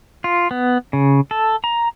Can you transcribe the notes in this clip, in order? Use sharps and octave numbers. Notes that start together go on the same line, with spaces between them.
F4
B3
C#3
A4
A#5